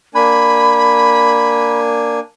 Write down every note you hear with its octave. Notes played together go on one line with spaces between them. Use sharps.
A#3 D4 G#5 B5